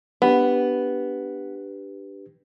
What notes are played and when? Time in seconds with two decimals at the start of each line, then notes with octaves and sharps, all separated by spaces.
0.22 B3 D4 G4 B4